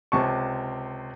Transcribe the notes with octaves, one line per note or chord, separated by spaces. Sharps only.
C#2 C3 A5 C#6